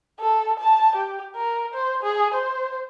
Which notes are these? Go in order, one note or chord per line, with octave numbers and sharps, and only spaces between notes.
A4
A5
G4
A#4
C5
G#4
C5